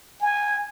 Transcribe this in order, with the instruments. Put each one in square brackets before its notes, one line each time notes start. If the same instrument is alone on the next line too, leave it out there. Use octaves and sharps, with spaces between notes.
[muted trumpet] G#5